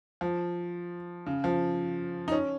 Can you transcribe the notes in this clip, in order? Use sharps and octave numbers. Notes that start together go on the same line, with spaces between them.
F3
C#3
F3
D#4
C#4